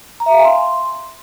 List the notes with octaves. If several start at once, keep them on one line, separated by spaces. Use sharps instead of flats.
A#5
E5
F5
G#5
C6